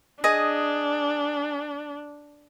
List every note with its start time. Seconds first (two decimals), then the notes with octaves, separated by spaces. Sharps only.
0.24 D4 G#4 D#5